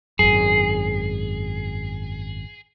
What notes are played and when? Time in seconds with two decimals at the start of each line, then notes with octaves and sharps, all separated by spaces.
0.19 G#1 F#2 G#4